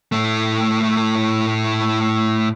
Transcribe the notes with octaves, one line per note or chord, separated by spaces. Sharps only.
A2 A3